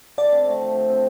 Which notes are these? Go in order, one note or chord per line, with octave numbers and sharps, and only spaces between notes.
D3 D5
C4
A3
F3
D3
C4